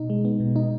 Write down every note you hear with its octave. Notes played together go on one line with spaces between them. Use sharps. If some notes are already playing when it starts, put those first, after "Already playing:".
Already playing: B2 D#4
G#3
B3
B2
D#4